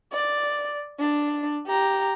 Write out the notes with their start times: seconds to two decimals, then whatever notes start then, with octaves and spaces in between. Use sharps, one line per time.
0.12 D5
0.99 D4
1.67 G4 A#5